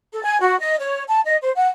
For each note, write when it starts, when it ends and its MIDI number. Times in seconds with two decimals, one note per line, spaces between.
0.12 0.21 69
0.24 0.37 80
0.40 0.58 66
0.59 0.75 75
0.78 1.04 73
1.07 1.21 81
1.26 1.37 75
1.41 1.50 72
1.56 1.67 78